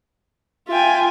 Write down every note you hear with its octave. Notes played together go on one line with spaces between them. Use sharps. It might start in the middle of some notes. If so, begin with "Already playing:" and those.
F4 E5 G5 G#5